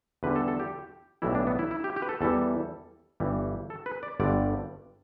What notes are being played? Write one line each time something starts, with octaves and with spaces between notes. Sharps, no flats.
E2 D3 G3 B4
A4
A4
G4
B1 A2 E3 G3 E4
D4
B3
E4
E4
G4
G4
B4
A4
E2 E3 G3 A4
G1 G2 E3 G3
A4
B4
D5
G1 G2 D3 G3 D5